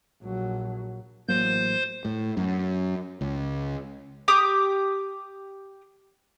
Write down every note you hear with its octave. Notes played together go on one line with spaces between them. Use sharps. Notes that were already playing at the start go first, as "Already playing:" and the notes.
A#1 F#3
A1 F#3 A#3 C5 G6
A2
F#2
C#2
G4 D6 D#6